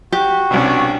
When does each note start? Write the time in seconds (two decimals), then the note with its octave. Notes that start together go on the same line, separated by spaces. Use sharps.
0.12 F#4 G4
0.51 C2 B2 C#4 D4